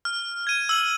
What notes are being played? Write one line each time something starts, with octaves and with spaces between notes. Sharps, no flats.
F6
G#6 D#7
E6 G#6 F#7